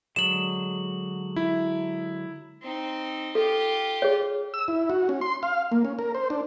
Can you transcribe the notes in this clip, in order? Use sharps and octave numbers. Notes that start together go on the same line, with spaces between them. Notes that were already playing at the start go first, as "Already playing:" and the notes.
D3 F#3 G#3 E7 F#7
E4
C4 D#4
F4 G4 A4
G#4 C#5
E6
E4
F#4
C#4
C6
F5
A#3
C#4
A#4
C5
D4